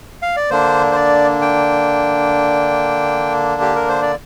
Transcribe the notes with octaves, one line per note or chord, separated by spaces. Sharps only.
F5
D5
D3 A#3 D4 C5
C5
D5
G5
G4
A#4
C5
D5